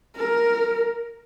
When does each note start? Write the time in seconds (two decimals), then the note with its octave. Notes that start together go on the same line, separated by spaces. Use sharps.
0.17 A#4